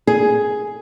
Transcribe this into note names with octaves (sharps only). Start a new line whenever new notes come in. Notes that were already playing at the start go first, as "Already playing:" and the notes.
G#4